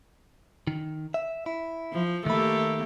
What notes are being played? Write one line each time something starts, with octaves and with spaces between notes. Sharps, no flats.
D#3
E5
E4
F3
D#3 A3 A#3 G4 B5